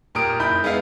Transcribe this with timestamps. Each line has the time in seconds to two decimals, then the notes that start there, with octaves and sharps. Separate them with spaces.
0.15 A#2 G4 A#4 D#6 D7
0.39 F#1 E4 B5 G6
0.63 G#3 B3 E4 G#4 B4 F5